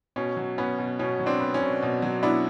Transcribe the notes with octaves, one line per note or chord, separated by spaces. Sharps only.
B2 C#4
F#3
B3 C#4
B2
B2 C#4
F#3
C4 D4
B3
C#4
B2
B2
F#3
B3 D4 E4